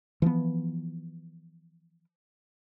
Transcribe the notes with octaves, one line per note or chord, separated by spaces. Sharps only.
E3 F3 A#3 B3